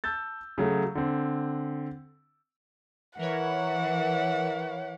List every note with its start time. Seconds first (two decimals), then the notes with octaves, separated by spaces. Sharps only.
0.04 A5 E6 G6 A6
0.58 C#3 F#3 A3
0.95 D3 C4
3.19 E3 A#4 B4 C#5 F#5